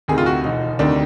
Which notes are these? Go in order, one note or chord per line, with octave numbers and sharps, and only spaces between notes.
D2 C3 D#3 G#4
F4
F#4
E1 D#4
D2 C3 D#3 D4